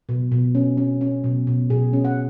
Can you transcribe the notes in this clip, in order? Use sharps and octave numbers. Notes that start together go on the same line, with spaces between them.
B2
B2
C#4
C#4
C#4
B2
B2
B2 G#4
C#4
F#5